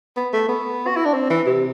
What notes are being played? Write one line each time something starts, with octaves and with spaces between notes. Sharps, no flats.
B3
A3
B3
F#4
E4
D4
C4
E3
C3